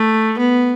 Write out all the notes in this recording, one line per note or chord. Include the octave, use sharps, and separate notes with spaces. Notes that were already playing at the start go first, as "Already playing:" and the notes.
Already playing: A3
B3